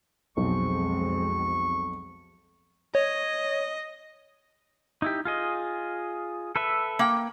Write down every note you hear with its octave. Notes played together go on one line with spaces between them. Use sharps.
B1 F2 G#3 C4 C#6
C#5 D#5
D#4 E4 G4
F4 G#4 D#5
A4 B4 E5
A#3 G5